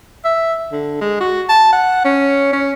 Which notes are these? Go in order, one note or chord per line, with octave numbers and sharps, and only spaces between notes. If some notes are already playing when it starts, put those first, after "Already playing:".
E5
D3
G#3
F#4
A5
F#5
C#4
C#4